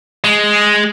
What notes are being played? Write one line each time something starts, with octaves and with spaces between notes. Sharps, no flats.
G#3